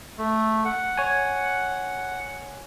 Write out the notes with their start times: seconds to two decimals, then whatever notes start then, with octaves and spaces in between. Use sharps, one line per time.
0.18 A3
0.65 F#5
0.97 C#5 G#5